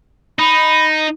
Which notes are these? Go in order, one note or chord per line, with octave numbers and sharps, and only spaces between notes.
D#4 B5